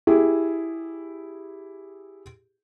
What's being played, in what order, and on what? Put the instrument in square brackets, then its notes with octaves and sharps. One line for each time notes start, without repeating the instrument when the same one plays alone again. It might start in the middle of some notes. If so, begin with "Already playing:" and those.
[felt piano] E4 G4 G#4